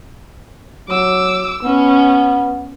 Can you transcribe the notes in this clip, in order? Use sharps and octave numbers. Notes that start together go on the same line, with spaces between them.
F#3 D6 E6
B3 C#4